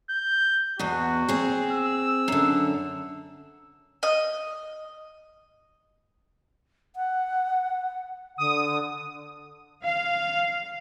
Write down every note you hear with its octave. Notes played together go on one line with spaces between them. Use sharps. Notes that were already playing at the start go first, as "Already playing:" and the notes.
G6
E2 B2 F#4
C4 G#4
E6
F#2 D3
D#5
F#5
D3 D#6
F5